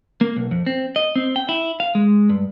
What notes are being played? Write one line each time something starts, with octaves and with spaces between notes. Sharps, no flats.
A#3
B1
F2
C4
D#5
C4
G5
E4
F5
G#3
G2